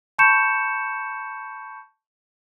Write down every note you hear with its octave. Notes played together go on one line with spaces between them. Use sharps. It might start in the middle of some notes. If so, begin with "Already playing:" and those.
A5 B5 C#6 G6 C#7 E7